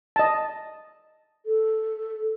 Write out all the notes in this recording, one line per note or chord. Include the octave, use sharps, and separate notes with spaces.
D#5 A5
A4